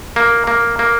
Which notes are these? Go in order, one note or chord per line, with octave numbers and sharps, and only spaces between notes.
A#3
A#3
A#3